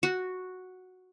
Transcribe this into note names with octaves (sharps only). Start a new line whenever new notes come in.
F#4